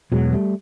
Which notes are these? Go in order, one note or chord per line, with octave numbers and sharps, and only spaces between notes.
E1 E2 B2 F#3 G#3
G3 A3